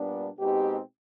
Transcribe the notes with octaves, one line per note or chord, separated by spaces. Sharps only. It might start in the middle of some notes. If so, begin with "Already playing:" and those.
Already playing: A#2 G3 B3 D4
B2 G#3 C4 D#4 G4